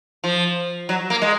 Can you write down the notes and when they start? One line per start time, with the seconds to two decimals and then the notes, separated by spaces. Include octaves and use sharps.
0.24 F3
0.89 F#3
1.10 A#3
1.22 G#3